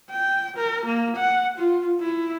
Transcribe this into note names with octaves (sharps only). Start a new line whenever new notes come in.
G5
A#4
A#3
F#5
F4
E4